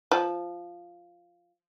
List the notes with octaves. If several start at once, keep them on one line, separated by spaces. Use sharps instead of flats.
F3